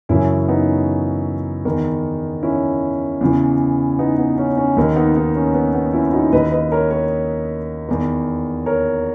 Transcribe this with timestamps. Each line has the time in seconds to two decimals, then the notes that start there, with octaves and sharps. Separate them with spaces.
0.09 F#2 C#3 E3 C#4 E4
0.48 B3 D#4
1.65 E2 D#3
2.43 C#4 E4
3.21 E2 C#3 E3
3.99 B3 D#4
4.18 B3
4.38 C#4
4.58 C#4
4.77 D#2 D#3
4.96 B3 D#4
5.16 B3 D#4
5.36 C#4
5.54 B3
5.74 B3
5.94 C#4 E4
6.13 D#4 F#4
6.32 D#2 D#3 B4 D#5
6.52 B4 D#5
6.72 A#4 C#5
6.91 A#4 C#5
7.88 E2 D#3
8.66 A#4 C#5